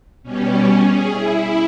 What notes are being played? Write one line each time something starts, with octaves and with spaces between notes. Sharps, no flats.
B2 G3 C#4
G#4
E4